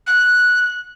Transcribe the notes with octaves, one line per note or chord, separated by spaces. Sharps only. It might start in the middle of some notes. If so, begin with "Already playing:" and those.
F#6